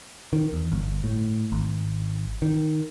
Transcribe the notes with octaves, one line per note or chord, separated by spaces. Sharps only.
D#3
E2
G1
A2
G#1
D#3